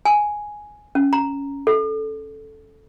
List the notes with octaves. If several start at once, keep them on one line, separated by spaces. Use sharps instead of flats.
G#5
C#4
A#5
A4